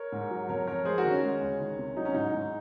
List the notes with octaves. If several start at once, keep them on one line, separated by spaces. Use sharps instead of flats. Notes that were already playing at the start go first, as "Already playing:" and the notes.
Already playing: A#4 C#5
G#2
F#3
F2 A#4 C#5
F2 A#4 C#5
G#3 G#4 C5
F#4 A#4
D#3
C#4
G#3
C#2
D#3
C3
F#3 D#4
C#4
G#2 D#4
G#2